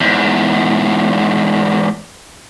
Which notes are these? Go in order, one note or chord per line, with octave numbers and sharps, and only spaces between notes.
E2 G#2